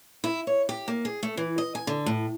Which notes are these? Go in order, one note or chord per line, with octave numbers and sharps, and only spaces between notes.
E4
C#5
G4
A#3
G#4
A3
E3
D#5
G#5
D3
A2